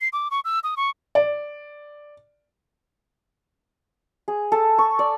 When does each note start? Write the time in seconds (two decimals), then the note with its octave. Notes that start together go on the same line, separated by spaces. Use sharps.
0.01 C7
0.13 D6
0.31 C#6
0.45 E6
0.64 D#6
0.77 C#6
1.15 D5
4.28 G#4
4.52 A4
4.78 C#6
4.99 D5